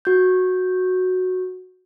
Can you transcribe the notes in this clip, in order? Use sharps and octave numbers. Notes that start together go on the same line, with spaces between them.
F#4 G6